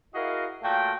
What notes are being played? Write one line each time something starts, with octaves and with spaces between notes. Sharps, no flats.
E4 F#4 G#4 A#4 D#5 F5
A#2 A3 F#4 F5 G5